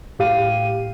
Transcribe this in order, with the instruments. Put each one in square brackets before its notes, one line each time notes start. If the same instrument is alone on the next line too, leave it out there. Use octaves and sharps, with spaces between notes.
[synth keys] A2 G4 F5 D#7